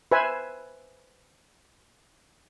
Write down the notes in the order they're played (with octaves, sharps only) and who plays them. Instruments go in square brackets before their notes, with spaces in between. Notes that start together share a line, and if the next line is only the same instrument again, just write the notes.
[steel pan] B4 C5 E5 G#5